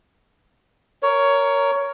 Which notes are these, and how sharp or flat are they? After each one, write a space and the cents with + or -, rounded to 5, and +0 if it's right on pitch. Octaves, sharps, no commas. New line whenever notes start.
A#4 +0 C#5 +15